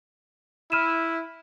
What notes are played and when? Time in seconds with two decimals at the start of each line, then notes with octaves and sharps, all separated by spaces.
0.72 E4 F6 D#7 E7